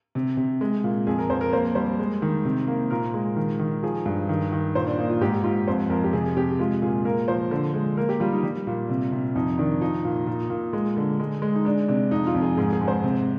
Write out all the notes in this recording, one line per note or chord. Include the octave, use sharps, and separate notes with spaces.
C3
C3
G#3
A#2
F2 G#4
A#4
F2 C5
A#4
A#3 C5
G3 C5
G#3
D#3
C3
A#3
A#2 A#4
G#3
D#3
D#3
F3 G#4
G2
D#3
D#3
A#2 C5
D4
A#3 D#4
F4
G#2 G4
G#2 F4
F2 C5
F2 A#4
G4
C3 G#4
C3 G4
G#3 F4
A#2 G#4
A#3 A#4
F3 C5
D3
G#3
A#3 A#4
G4
G3 F4
D#4
G3
A#2
C3
C3
F2 D#4
D#3 D4
F3 D#4
A#2
A#2
A#2
G#3
D3
G#3
G#3
D#4
G#3 D4
C3 D4
F2 D#4
F4
F2
G#4
G#2 G#4
G#4
G#2
C5
C3